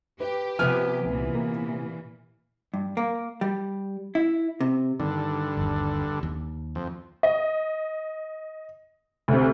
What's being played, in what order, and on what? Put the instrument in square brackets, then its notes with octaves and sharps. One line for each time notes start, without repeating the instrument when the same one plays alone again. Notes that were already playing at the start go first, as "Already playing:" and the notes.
[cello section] G4 [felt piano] B4
[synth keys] C3 B3 G#5 [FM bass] F3 [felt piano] B4 F6
[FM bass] C2 [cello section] A#2 E3
[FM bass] A#3
[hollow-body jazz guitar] G2
A#3
G3
E4
C3
[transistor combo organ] G2 D3 [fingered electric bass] D#3
[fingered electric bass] G1 D#2
D#2
[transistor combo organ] F2
[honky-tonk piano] D#5
D2 C3